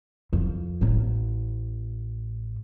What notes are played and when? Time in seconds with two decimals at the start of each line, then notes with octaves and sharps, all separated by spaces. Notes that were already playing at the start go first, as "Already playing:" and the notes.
0.33 F2
0.81 A1 A2